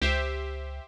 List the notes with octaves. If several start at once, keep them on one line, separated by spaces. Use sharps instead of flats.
C#2 G4 C5 E5